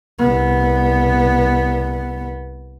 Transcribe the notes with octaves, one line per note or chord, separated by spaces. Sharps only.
C2 B3